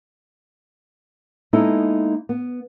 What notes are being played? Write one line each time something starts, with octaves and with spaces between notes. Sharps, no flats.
G#3 A#3 B3 D#4 E4 A4
B3